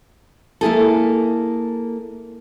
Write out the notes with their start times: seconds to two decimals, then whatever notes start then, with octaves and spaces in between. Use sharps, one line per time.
0.61 A#3 E4 G#4 A4